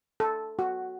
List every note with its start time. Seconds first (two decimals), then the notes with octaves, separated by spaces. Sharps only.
0.20 A4
0.59 F#4